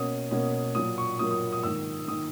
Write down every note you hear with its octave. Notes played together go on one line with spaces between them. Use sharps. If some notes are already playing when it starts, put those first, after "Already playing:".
Already playing: B2 A#3 C#4 D#6
B2 A#3 C#4
A#2 F#3 A#3 D#6
C#6
A#2 F#3 A#3 D#6
D#6
D#6
G#2 D#3 A#3 E6
D#3 A#3 D#6